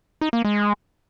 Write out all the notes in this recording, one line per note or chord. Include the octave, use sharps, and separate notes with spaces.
D#4
A#3
G#3